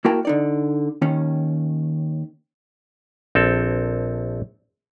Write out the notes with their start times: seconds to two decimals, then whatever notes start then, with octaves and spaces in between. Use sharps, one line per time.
0.05 A#3 E4 F#4 A#4 G5 A5
0.25 D3 D#4 D5
1.02 D#2 D#3 C#4
3.35 A#1 C4 A4